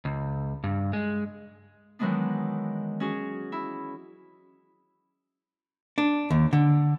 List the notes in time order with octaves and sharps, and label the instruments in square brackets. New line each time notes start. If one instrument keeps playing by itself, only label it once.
[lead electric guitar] C#2
G2
G#3
[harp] D#3 E3 F#3 G#3 B3 D4
C#4 F#4 G#4
E4
[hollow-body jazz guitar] D4
D#2
D3